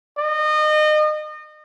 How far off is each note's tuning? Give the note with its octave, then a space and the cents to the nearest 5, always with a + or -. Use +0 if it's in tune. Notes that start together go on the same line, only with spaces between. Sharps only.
D#5 -30